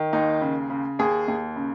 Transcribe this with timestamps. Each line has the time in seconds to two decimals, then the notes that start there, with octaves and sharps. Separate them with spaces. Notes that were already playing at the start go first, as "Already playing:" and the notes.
Already playing: D#3
0.13 D#2 D#4
0.41 C#3
0.70 C#3
0.99 D#2 G#4
1.28 D#2
1.56 C#3